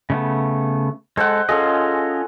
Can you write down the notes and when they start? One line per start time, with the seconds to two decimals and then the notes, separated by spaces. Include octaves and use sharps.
0.10 C#3 A3 B3
1.17 G#3 A4 C5 F#5
1.49 C#4 F4 G#4 A4 D#5